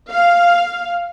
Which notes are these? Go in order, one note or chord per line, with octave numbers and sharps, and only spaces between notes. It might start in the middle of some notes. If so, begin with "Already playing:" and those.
F5